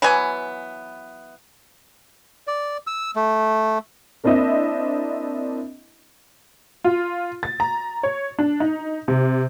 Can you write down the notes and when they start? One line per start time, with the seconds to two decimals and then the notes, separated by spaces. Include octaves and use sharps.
0.02 E3 F#3 B3 G#5
2.47 D5
2.87 E6
3.16 A3
4.24 A#3 C4 D4 E4 D#5 E5
6.84 F4
7.43 A6
7.60 A#5
8.03 C#5
8.39 D4
8.60 D#4
9.08 C3